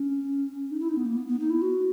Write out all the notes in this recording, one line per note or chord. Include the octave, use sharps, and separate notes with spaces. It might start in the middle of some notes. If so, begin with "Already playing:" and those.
Already playing: C#4
D#4
E4
D#4
B3
A#3
B3
B3
D#4
E4
F#4